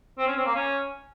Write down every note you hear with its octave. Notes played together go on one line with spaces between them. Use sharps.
C4
C#4
C4
A#3
C#4